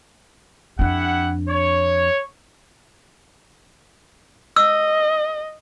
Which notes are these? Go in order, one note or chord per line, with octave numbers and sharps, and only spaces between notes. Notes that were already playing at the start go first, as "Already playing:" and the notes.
F2 D4 E4 G4 F#5
C#5
D#5 E6